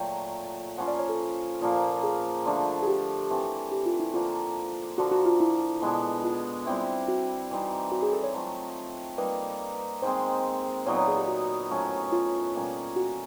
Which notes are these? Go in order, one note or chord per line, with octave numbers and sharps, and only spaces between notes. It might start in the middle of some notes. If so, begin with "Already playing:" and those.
Already playing: A#2 F#3 A3 G5
F3 A#3 C#4 F4 F#5
D5
C#5
A4
A#2 F3 A#3
G#4
D3 F3 A3 D4
G#4
G4
E3 A3 C4
G4
F4
E4
D3 F3 A#3 D4 F4
D3 F3 A#3 F#4
F#4
F4
E4
B2 G#3 B3 D4
F4
G3 C4 E4
F#4
E3 G3 C4 D#4
F#4
G#4
A4
C#5
F#3 A3 C4 F4
G3 A#3 D#4 B4
D#3 G#3 C4 C5
A#2 F#3 B3 D#4 C#5
C#5
G#4
G4
F#4
A2 F#3 A3 C#4
F4
B2 G3 A#3 C#4
F#4